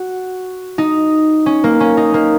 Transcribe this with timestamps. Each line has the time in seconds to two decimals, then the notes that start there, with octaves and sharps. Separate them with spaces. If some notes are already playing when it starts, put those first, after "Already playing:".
Already playing: F#4
0.78 D#4
1.46 C#4
1.64 A#3
1.80 C#4
1.97 D#4
2.14 A#3